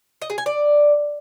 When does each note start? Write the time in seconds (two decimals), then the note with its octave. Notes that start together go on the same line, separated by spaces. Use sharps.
0.22 D#5
0.30 G#4
0.38 G#5
0.46 D5